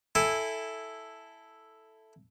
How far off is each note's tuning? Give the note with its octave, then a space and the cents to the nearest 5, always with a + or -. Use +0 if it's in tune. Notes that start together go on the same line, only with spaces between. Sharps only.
E4 +0 A4 +0 G#5 -20